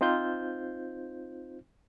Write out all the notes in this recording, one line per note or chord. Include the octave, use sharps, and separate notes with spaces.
C4 D#4 F4 C5 G6